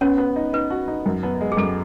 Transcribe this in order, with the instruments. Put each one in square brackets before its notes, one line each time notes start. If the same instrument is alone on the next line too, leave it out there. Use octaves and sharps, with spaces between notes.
[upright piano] B3 [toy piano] C#4 C#5
[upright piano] B3
D#4
[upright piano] D#4 [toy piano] B4
[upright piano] F#4
D#4
F#2
B3
G#3
[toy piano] G#4
[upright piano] F#2 [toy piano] A4